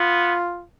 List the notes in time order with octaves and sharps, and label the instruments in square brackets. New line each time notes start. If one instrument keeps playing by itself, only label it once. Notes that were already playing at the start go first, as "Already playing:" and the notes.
Already playing: [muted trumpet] B3 [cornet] F4